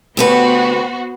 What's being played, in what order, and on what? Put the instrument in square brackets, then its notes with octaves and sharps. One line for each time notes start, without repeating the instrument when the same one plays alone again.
[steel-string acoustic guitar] D2 G4 B4 [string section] B3 F#4 C5